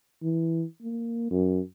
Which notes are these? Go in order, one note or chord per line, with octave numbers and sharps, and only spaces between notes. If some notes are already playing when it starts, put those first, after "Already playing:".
E3
A#3
F#2